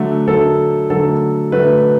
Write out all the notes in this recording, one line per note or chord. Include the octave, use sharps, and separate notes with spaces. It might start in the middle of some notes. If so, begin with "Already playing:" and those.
Already playing: D3 F#3 A3
D3 F#3 A3 A4
D3 F#3 A3 A4
D3 F#3 A3 B4